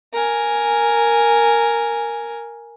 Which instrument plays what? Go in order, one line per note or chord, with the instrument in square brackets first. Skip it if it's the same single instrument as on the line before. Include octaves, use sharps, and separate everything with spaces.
[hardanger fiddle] A#4 G#5